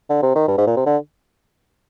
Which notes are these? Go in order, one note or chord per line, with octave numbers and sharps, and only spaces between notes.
D3
C3
D#3
G2
G#2
A#2
C3
D3